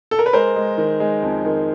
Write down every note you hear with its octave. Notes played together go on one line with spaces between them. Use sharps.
A4
A#4
B4
G#3 A#4 C5
G#3
D#3
G#3
F2
D#3